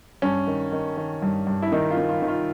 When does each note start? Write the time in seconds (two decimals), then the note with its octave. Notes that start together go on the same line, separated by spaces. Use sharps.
0.22 G2 C#4
0.47 D#3
0.72 D#3
0.97 D#3
1.22 G2
1.47 G2
1.62 E4
1.72 D#3 D#4
1.91 F4
1.97 D#3
2.09 F4
2.22 D#3
2.28 F4